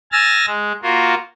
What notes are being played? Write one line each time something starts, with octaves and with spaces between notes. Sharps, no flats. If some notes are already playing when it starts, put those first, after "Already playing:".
G#5 E6 F6 A6 A#6
G#3
A#3 F4 F#4